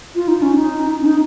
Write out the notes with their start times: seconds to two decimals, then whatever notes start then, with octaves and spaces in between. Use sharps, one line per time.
0.15 F4
0.28 D#4
0.42 C#4
0.56 D#4
1.02 C#4
1.06 D#4